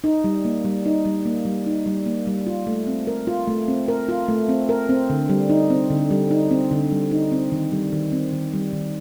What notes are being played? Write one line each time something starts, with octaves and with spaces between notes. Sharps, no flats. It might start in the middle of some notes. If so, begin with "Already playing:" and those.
D#4
G3
A#3
G3
D#4
G3
A#3
G3
D#4
G3
A#3
G3
F4
A3
C4
A#4
F4
A3
C4
A#4
F4
A3
C4
A#4
C4
D3
G3
D#4
C4
D3
G3
D#4
C4
D3
G3
D#4
C4
D#3
G3
D#3
C4
D#3
G3
D#3